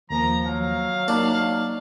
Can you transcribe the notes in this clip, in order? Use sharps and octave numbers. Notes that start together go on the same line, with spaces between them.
D#2 F3 A#3 A#5
F#3 F5
A#3 D4 D#4